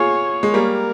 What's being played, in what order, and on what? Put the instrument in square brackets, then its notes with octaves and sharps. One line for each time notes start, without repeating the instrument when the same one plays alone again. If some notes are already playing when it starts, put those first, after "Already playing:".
Already playing: [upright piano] F4 G#4 [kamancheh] C#5
[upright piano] G#3
[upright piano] G3 A#3 [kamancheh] A#4